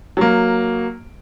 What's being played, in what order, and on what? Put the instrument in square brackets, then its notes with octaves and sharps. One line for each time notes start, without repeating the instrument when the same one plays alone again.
[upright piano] F#3 A#3